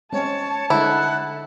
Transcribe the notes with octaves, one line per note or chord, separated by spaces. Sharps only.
G#3 C4 C#4 C#5 A5
D3 G#3 E4 F#5